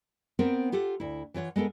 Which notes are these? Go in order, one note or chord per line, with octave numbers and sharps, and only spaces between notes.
B3 C4 A#4 C5
F4 G4 A4 F#5
D2 E4
E3 F4 C#5 F#5
G#3 B3 A4 A#4